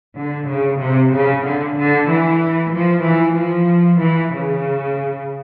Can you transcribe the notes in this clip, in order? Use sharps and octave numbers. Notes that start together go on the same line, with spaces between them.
D3
C#3
C3
C#3
D3
D3
E3
F3
E3
F3
E3
C#3